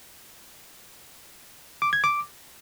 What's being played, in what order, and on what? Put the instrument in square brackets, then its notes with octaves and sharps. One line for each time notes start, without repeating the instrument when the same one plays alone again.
[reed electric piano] D6
G#6
D6